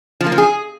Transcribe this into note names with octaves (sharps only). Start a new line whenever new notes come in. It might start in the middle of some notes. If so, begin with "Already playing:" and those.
F3
A#3
F3
G#4